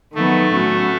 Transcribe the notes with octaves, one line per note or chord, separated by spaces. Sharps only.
D#3 F#3 A3 B3
A2 F#3 C#4 F#4